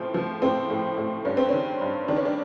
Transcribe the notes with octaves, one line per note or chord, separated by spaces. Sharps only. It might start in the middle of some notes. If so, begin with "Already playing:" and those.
Already playing: A2 F3 C4
F3
A2 C4
A2
A2
G2 C#4
C4
D#3 C#4
G2
D#3 D4
C#4
D4